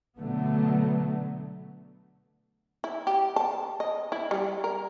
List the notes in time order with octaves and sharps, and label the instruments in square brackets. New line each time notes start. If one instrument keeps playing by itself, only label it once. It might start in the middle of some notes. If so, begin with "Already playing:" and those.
[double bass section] B2 D3 F#3 A3 B3
[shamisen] E4
G4
A5
D#5
E4
G3
A#4